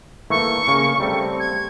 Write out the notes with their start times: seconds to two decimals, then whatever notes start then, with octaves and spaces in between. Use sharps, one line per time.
0.30 E3 A3 A#3 C#6
0.68 C#3 A#3
1.00 G3 A3 C4
1.40 G#6